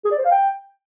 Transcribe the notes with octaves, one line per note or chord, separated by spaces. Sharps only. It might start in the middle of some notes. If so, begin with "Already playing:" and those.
G#4
D5
C5
F5
G5